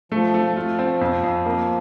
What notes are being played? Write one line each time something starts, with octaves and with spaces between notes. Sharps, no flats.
F3 A3
A3
F3 F4
C4
F2
F2
A#3